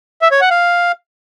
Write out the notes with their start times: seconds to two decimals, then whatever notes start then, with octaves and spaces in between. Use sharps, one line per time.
0.22 E5
0.31 C#5
0.41 F#5
0.51 F5